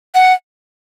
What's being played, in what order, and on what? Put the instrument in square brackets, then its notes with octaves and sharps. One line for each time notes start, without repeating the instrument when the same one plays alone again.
[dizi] F#5